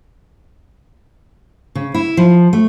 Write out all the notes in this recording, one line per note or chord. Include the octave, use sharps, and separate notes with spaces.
C#3
E4
F3
A3